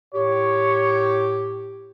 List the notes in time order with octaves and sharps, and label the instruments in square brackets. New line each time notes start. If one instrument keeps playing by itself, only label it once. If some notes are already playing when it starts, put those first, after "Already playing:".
[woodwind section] A2 G4 [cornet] C#5